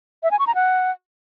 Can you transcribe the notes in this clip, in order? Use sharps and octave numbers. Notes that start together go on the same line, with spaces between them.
E5
G#5
C#6
A#5
F#5